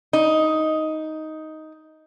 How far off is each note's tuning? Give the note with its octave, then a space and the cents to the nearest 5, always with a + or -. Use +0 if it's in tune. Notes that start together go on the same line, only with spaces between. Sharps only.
D#4 +10